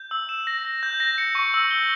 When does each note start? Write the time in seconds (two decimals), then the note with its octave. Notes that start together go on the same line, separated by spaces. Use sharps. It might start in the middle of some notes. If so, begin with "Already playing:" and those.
Already playing: G6
0.11 E6
0.29 E7
0.47 A#6
0.65 A#6
0.83 G6
1.00 A#6
1.18 C#7
1.35 C#6
1.54 E6
1.71 G7